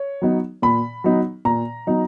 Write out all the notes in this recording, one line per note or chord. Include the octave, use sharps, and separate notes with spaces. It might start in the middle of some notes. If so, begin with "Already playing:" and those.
Already playing: C#5
F#3 B3 D#4
A#2 B5
F#3 B3 D#4
A#2 A#5
F#3 B3 D#4